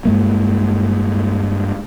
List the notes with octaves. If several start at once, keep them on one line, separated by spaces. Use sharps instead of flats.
G2 G#3 A#3